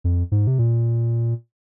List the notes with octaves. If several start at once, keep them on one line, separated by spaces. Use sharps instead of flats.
F2
G#2
C3
A#2